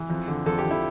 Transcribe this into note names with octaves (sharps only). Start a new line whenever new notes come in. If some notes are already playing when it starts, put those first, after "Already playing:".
Already playing: E3
F2
D3
F2 A4
G4
F2
E4